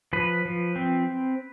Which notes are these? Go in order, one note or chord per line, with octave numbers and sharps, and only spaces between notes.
F3 B4
F3
C4